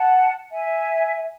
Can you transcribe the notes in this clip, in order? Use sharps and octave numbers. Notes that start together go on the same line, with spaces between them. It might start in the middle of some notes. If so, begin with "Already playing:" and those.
Already playing: F#5 A5
E5 G#5